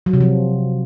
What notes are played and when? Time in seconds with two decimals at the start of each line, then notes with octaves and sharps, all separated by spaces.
0.06 F#3
0.13 C3
0.21 F3